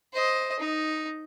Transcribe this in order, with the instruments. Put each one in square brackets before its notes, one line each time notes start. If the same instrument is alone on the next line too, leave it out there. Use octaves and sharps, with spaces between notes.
[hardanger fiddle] C5 D#5
D#4